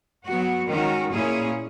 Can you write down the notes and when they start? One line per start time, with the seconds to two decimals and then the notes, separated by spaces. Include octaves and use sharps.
0.25 F#3 B3 F#4
0.68 D#3 G#3 C#4 F#4 A#4
1.11 A#2 A#3 C#4 E4 G#4